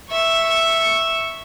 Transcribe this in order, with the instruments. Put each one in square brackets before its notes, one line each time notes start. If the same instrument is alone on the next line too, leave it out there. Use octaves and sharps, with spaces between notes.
[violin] E5 C#6